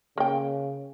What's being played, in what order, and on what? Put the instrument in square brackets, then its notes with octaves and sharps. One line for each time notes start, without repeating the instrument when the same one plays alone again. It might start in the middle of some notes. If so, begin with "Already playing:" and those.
[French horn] C#3 [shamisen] A#3 G5